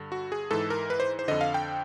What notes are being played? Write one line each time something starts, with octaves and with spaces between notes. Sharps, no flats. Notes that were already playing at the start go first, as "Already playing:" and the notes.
Already playing: G2 D3
F#4
G#4
G#2 E3 A4
A#4
B4
C5
C5
F2 D3 D#5
F5
G5